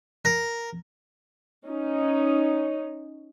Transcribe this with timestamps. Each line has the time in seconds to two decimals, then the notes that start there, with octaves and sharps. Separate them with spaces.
0.25 A#4
1.66 C#4 D#4